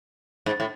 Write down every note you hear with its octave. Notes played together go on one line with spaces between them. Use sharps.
G#2
A2